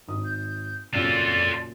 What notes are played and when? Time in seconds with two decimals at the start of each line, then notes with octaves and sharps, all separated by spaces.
0.08 G#1 D#4 D#6
0.25 G6
0.94 F#2 A#2 C#3 F4 A4 D5